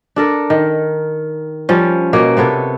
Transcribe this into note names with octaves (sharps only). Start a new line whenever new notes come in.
D4 A4 A#4
D#3
F3 G3 C#4
B2 A#3 C#5
C3 B3 A4 C#5